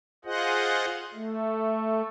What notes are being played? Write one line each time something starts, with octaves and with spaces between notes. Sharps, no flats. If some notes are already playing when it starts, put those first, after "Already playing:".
F4 G#4 C5 D#5 F#5
A3